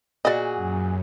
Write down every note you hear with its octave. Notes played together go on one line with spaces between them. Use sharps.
A#2 F#4 G#4 D5 D#5
F#2